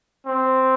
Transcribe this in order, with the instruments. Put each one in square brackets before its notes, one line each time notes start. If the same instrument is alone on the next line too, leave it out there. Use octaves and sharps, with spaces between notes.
[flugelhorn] C4